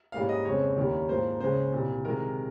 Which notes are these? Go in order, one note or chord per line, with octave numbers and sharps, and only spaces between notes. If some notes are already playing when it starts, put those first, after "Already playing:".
G#2 G3 A#3 C#4 F5
D#5
F2 C#3 G#3 C4 C#5
D#2 D#3 G3 A#3 C#4
G#2 F3 A#3 C5
C#2 C#3 G#3 C#4 C5
C2 A#2 G3
C3 D#3 G#3 A#4